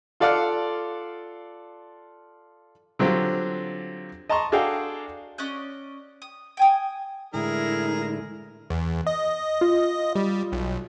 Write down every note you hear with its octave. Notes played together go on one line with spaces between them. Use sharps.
F4 A4 D5 F5 F#5 F6
D3 F#3 C4 F4 G4
D#5 A5 A#5 C6 C#6
D4 F#4 G#4 A4 F5 G5
C#4 D5 D#5 F#6
D#6
G5 G#5 D#6
A2 D3 G#3 E4 G#4 A#4
E2
D#5
F4
G3
B1